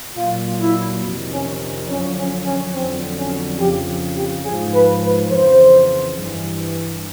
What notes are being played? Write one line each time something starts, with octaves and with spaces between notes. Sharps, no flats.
A#2 F#3 F4
E4
F2 C3 D#3
C#4
F#2 D3 F3 C#4
C#4
C#4
F2 D3 F#3 C4
C#4
F2 C#3 F3 G4
G4
G#2 F3 G#4
B4
B4
F2 C#3 E3 C5
G2 E3